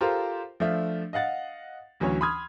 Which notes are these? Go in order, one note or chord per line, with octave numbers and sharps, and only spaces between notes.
F4 G4 A4 A#4 C5
F3 A3 D4 E5
D#5 F5 F#5 A6
D2 E3 F#3 C#4 C#5
B5 C6 D#6 F6 G#6